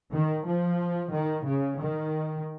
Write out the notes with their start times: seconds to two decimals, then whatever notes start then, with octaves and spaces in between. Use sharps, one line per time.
0.11 D#3
0.45 F3
1.11 D#3
1.45 C#3
1.79 D#3